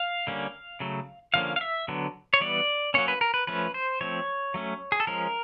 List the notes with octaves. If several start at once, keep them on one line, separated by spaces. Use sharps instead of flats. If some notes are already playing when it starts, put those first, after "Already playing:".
Already playing: F5
D3 G3 A#3 C#4
C#3 F#3 A3
D3 F3 A#3 C#4 F5
F5
E5
D3 F#3 B3
C#5
E3 G3 B3 D5
F#3 A#3 C#4 C#5
B4
A#4
B4
F3 A3 C#4 B4
C5
F3 A3 C4 C#5
F#3 A3 C#4
G#4
A4
F3 G#3 C#4 A#4